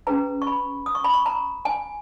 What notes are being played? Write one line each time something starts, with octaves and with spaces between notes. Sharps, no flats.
C#4 G#4 B4 A#5
C#6
B5
D#6
C#6
B5
C#6
A#5
G#5